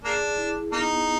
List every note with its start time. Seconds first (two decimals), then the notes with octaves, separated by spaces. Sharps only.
0.04 A#3 D4 G#4
0.38 E4
0.72 A#3 B3 D#4